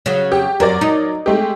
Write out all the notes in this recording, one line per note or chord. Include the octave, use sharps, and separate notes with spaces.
C#3 F#3
G4
F#2 F#3 A#4 D5
D#4
G#3 A3 G4